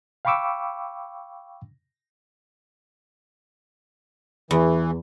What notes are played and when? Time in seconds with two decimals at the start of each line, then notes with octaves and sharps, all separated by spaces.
0.25 F5 G5 B5 C#6 D6 E6
4.51 E2 E3